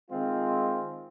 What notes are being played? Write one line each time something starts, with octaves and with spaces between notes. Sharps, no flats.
D#3 G#3 C4 F4